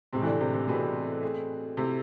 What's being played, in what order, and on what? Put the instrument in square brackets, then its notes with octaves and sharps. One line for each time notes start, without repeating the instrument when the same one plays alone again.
[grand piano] A2 G#3 C4 [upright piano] C3
[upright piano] E3
D3
C3
C3
[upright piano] B2 [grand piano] E3 A3 C4 G#4 B4
[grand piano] A3 C4 G#4
[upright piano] C3 [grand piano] A3 E4 A4